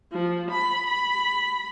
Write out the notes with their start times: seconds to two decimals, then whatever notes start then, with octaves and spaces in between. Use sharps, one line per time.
0.13 F3
0.50 B5
0.87 B5